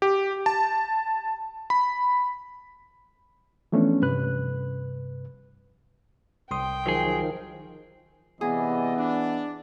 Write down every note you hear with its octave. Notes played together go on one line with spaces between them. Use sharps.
G4
A5
B5
E3 F3 A3 B3 C#4 D4
G2 C3 B4 F#6
C2 G5 C6 D#6
D#3 F3 F#3 G#4
C3 E3 B3 G#4 D5 D#5
D4